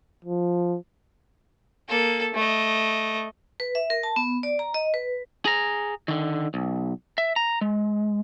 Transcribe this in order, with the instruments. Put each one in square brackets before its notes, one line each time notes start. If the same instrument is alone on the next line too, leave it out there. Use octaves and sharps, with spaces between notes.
[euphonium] F3
[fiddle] A#3 A4
A3 D#5
[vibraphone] B4
E5
A#4
A5
B3
D5
A#5
D#5
B4
[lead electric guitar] G#4 A#5
D3 D#3
B1
E5
A#5
G#3